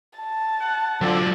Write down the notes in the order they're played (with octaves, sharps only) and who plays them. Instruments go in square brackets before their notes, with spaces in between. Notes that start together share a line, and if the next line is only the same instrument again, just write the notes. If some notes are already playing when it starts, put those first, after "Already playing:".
[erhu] A5
[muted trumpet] F#5
[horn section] D3 C4 [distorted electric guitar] F#3 F4 [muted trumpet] D5